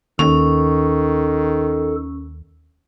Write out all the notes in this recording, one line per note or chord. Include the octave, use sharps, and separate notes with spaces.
D#2 D#3 C#4 A4